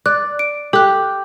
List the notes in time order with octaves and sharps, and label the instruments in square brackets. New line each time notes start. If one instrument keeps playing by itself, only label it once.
[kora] D5 [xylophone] F#6
[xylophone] D7
[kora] G4 [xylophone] A4 F#6